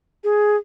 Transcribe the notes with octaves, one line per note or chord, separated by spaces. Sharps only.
G#4